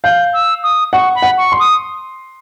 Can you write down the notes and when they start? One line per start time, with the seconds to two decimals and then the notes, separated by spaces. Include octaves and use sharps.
0.04 F5 G6
0.34 E6
0.63 D#6
0.93 F#5 C#6
1.15 B5
1.22 F#5
1.38 C#6
1.52 C6
1.60 D#6